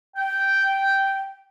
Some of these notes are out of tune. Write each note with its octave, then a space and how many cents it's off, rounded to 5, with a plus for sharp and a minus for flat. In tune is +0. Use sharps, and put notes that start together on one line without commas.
G5 -5